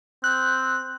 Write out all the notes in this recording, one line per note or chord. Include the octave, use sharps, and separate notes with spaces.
C4 F#6